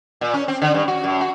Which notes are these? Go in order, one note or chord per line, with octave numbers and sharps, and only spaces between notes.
A#2
C#4
C4
D3
G2
F#4
F#2
F#4